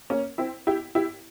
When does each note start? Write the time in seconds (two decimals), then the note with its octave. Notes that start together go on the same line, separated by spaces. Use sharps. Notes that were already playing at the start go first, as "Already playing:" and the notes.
0.10 A#3 C#4
0.38 C4 E4
0.67 E4 G4
0.95 E4 G4